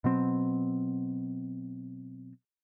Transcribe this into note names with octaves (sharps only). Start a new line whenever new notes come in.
B2 F#3 C4